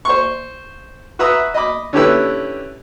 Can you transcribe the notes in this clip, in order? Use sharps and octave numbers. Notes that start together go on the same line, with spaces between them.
C5 C#6
F#4 B4 E5 A#5 D#6 E6
D#5 B5 D6
D3 C#4 E4 G4 B4 E6